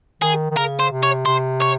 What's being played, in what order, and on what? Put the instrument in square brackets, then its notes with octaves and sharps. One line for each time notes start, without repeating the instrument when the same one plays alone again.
[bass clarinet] D#3 [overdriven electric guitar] G#4
[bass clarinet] D#3
[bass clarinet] C#3 [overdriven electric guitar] A#4
[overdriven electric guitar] C5
[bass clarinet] C3
[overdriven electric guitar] C#5
[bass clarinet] C3 [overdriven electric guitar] C5
[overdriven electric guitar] C#5